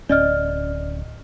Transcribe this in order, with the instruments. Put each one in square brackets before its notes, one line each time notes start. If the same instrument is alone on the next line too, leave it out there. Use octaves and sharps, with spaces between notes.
[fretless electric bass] D1 C#4 [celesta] D5 D#5 F6